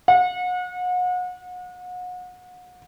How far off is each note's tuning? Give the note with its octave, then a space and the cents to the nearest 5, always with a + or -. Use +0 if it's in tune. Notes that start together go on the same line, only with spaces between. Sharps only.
F#5 -35